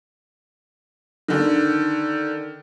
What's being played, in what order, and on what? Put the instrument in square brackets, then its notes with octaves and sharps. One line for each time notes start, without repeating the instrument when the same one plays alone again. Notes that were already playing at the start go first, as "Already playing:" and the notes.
[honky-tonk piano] D3 D#3